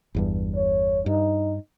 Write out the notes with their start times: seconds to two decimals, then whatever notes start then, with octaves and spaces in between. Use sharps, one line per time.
0.15 G1 E2 G2
0.55 C#5
1.06 G2 D#4